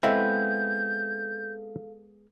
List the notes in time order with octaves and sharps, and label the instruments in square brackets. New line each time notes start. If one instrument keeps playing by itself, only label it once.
[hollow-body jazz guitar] G#3 B3 [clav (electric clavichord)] C4 E4 E5 [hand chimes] A4 F5 [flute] G6